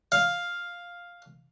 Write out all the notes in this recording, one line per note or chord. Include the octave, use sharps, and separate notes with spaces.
F5